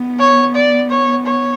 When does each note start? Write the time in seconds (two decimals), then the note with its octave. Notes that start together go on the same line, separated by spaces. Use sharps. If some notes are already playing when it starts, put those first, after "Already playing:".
Already playing: B3
0.19 C#5
0.55 D5
0.90 C#5
1.26 C#5